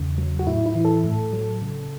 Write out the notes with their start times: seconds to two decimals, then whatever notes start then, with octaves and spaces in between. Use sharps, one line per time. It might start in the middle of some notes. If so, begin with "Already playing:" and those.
Already playing: E2 C#3
0.18 F#3
0.39 F#4
0.47 A2 E4
0.66 E4
0.75 E3
0.85 A4
1.04 A2
1.33 F#3
1.62 C#3